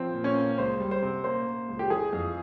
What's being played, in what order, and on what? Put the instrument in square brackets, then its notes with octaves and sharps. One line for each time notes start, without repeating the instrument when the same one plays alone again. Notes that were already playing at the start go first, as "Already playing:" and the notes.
Already playing: [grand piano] F3 [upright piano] C4
[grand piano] A#2
[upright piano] C#4
[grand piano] A#3
[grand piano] C#2 [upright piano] C5
[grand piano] G3
[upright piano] C5
[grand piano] C3
[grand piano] A#3 [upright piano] C5
[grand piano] A#3
C#2
[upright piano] G4
[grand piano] E3 [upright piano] G#4
[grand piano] F2